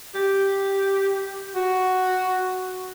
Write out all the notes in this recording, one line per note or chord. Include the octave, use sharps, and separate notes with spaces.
G4
F#4